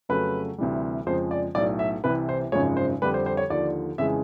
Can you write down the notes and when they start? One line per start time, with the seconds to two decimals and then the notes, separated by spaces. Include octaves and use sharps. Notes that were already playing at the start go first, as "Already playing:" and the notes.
0.09 F2 C#3 F#3 A3 B4
0.58 D2 C3 E3 G3
1.06 F2 C#3 F3 G#3 C5
1.31 D5
1.55 B1 A2 F#3 D5
1.79 E5
2.04 C2 C3 E3 B4
2.29 C5
2.52 G#1 F#2 C#3 F3 G#3 C#5
2.77 C5
3.02 F2 D3 G3 B4
3.14 C5
3.26 C5
3.37 C#5
3.50 D#2 D3 F3 D5
3.98 F2 C#3 E3 G#3 E5